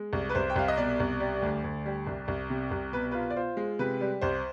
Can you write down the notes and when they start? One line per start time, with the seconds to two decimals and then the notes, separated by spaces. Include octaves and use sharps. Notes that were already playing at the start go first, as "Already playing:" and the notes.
Already playing: G#3
0.13 C2
0.29 B4
0.35 C2 C5
0.50 G5
0.56 C2 F5
0.68 D#5
0.78 B2 D5
1.00 C2
1.20 G3
1.42 D2
1.64 D2
1.86 G3
2.07 C2
2.28 C2
2.50 C3
2.71 C2
2.92 B2 B4
3.11 F4 B4
3.30 D5
3.36 F4 C5
3.57 G#3
3.79 C3 B4
4.01 G3
4.21 C2 C5